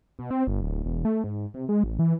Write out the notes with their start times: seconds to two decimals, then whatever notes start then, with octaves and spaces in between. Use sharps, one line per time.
0.19 B2
0.31 C4
0.47 G1
0.62 D1
0.85 E1
1.05 A3
1.24 G#2
1.54 C3
1.69 G#3
1.84 A1
1.99 E3